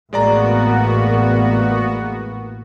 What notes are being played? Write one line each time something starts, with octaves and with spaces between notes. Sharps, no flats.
A1 A2 G#3 A#3 B3 F#4 D5 A#5